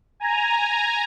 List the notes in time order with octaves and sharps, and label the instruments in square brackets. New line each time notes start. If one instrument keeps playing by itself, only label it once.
[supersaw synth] G#5 A#5